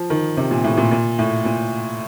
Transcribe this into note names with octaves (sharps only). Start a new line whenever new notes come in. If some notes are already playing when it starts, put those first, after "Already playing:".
Already playing: F3
D#3
C3
A#2
A2
A#2
A#2
A2
A#2